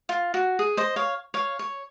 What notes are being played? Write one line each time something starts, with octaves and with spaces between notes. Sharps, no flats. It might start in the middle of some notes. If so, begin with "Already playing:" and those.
F4
F#4
G#4
C5 D#5
C#5 F5
C#5 F5
C#5